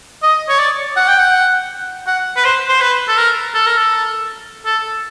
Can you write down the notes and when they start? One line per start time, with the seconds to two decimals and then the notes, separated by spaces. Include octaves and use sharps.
0.23 D#5
0.49 C#5
0.59 D5
0.97 F#5
1.08 G5
1.19 F#5
2.07 F#5
2.36 B4
2.45 C5
2.69 C5
2.81 B4
3.08 A4
3.17 A#4
3.54 A4
3.66 A#4
3.77 A4
4.65 A4